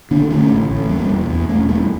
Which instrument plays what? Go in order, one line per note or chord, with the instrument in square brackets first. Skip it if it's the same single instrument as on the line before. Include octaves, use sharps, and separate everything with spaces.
[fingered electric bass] D3 A#3 D4
D3 A3 C#4
A1
A1
E2 G3 A#3
E1
E2
E1 A3 C#4
E1 G3 A#3